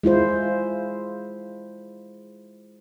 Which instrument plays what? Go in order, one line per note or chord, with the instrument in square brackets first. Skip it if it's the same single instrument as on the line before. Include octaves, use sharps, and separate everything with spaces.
[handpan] G#3 E4 F4 C5